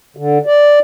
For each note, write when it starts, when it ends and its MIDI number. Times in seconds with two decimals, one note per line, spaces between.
0.17 0.38 50
0.46 0.79 74